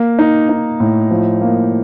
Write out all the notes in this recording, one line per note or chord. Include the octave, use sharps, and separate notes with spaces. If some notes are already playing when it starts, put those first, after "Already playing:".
Already playing: A#3
D#4
D#4
A2
F3
A#3